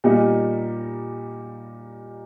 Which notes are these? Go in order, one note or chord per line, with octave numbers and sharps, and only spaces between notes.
A#2 G3 A#3 D#4